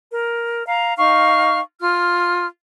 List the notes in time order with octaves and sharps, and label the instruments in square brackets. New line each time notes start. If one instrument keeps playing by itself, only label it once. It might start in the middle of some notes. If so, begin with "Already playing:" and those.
[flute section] A#4
F5 A#5
D#4 F5 C#6 F6
F4 F6